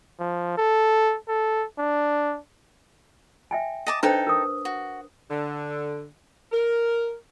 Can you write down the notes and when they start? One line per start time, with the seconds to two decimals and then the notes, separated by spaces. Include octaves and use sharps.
0.19 F3
0.57 A4
1.28 A4
1.78 D4
3.51 E5 G5 G#5
3.87 D#5 A5 D6
4.03 D4 D#4 A4 B4 C5 G5
4.27 A#4 D#6
4.65 F#4
5.30 D3
6.52 A#4